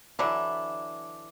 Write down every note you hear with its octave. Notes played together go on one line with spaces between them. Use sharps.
D3 E3 F#3 D4 E4